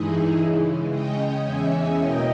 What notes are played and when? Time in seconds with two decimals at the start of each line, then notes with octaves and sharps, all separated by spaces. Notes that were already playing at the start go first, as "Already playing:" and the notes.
Already playing: G2 E3 G#3 D#4 E4 G#4
0.36 C#3 E3 G#3
0.90 C#3 G#3 C#4 D#5 G5
1.43 E2 C#3 E3 G#3 C#4 E5 G#5
1.97 E2 B2 A#3 C#4 D#5 G5